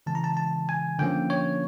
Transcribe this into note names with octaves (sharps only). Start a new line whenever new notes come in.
C#3 E3 G#3 C4 A5
A#5
A5
A5
G#5
D3 F3 A#3 C#4 G5
C#5